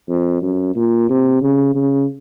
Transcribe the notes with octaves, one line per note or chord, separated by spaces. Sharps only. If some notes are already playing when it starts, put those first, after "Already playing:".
F2
F#2
A#2
C3
C#3
C#3